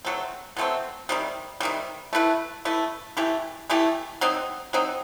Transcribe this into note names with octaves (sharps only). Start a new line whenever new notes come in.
B2 F#3 A3 C4
B2 F#3 A3 C4
C3 D#3 G3
C3 D#3 G3
A3 E4 B4
A3 E4 B4
E3 A3 E4 G4
E3 A3 E4 G4
F#3 C4 D#4
F#3 C4 D#4